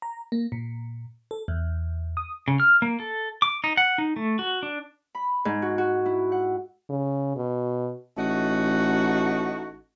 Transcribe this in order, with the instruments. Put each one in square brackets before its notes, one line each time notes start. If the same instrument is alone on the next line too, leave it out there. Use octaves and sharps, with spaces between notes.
[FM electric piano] A#5
A#3
A#2
A4
E2
D#6
[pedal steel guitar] C#3
F6
A#3
A4
D6
D#4
F#5
D#4
A3
F#4
D4
[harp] B5
G#2
F#4
F#4
E4
F#5
[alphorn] C#3
B2
[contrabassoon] A1 [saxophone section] A3 D#4 F#4